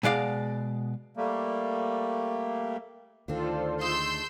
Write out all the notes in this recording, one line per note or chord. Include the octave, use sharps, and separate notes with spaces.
B2 G#3 D5 F5
G3 A3 A#3
D2 D#3 C4 D4 F4 A4 C5
G#3 A3 C6 E6 G6